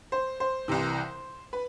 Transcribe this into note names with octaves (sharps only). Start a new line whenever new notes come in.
C5
C5
C2 C3 E3
B4